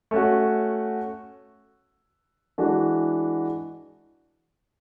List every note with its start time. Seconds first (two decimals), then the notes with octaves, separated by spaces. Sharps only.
0.11 A3 C#4 F#4
2.58 E3 G#3 D4 F#4